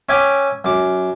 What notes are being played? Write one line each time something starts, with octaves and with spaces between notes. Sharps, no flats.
C#4 E5 G5 G#5 D6
F#2 D6